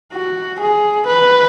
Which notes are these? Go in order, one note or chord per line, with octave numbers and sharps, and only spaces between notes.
F#4
G#4
B4